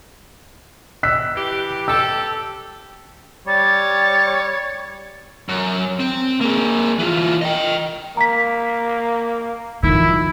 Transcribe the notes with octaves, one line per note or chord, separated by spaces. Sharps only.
E6 F#6 B6
E3 G4
G4 A4 E6
G3 C#5 A6
F#2
C4
A#3 G#4
E3 F4
D#5 G5
A#3 A#5 B6
F2 D#3 E4